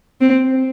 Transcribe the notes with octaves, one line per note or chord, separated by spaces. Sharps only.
C4